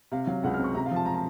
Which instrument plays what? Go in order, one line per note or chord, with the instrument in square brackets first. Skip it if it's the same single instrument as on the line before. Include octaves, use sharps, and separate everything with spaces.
[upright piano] C3 F5
F#3 F5
C#2 F#5
F6
C4
C#6
C3 A#5
F5
F3 A5
A#5
A5